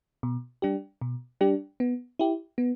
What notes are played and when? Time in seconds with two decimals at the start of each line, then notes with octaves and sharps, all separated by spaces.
0.23 B2
0.62 G3 D4 G4
1.01 B2
1.41 G3 D4 G4
1.80 B3
2.19 E4 G4
2.58 B3